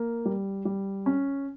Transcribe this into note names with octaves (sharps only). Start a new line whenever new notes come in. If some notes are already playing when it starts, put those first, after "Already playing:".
Already playing: A#3
G3
G3
C#4